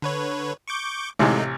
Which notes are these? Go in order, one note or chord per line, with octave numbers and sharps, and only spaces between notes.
D3 B4 C#5
C#6 D6 G6
A1 C3 G#3 A3 D#4